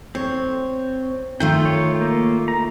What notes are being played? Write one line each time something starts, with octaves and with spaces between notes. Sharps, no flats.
C4 C#5
D#3 A3 F4 G5
C#5
A#3
A#5